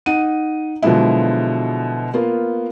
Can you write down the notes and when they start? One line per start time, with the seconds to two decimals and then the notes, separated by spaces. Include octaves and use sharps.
0.06 D#4 F#5 D#7
0.82 B2 D3 F3 F#3 G#3 E4
2.14 A#3 B3 F4